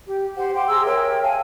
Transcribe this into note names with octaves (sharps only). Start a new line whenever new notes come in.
G4
G4 C5 F#5
F5 G5 C6 D6
G#4 A#5 C6 E6
A#4 C#5 E5 G5
F5 G#5 A5